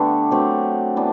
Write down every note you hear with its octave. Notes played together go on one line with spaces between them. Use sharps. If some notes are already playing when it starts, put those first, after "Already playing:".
Already playing: D3 A3 B3 D4 G4
F#3 A3 C4 G4
E3 B3 D4